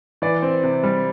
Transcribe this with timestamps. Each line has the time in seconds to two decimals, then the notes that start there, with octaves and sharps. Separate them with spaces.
0.22 E3 D5
0.42 C4
0.63 C3
0.83 G3